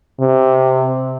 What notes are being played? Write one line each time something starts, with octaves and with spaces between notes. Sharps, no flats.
C3